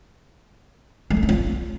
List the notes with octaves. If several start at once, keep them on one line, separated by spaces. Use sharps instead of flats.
G3
A3
D4
F4